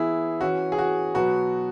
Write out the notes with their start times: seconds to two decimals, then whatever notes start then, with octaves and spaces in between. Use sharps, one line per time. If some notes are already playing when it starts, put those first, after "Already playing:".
Already playing: E3 B3 E4 G#4
0.41 E3 C#4 F#4
0.72 G#4
0.78 F#4
1.14 B2 F#3 B3 F#4